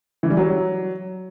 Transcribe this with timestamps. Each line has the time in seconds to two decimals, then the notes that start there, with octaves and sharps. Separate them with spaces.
0.23 E3
0.30 G3
0.37 F#3